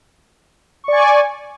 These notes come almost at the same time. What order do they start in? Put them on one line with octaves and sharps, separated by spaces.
C#6 D5 G#5